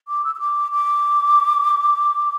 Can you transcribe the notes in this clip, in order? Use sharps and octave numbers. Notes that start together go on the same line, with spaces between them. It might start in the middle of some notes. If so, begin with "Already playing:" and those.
D6
E6
E6
D6
D6